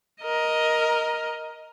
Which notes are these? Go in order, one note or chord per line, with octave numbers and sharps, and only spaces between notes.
A#4 D#5